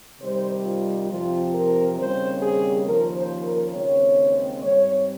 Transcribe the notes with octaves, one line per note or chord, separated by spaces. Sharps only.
C3 D#3 G3 C5
F4
F2 C3 F3 C4 F4
A#4
D#2 C#3 G3 C4 C5
G#4
D#2 C#3 F3 A#4
C5
A#4
D#2 C#3 G#3 C4 C#5
G#2 G3 C4 C#5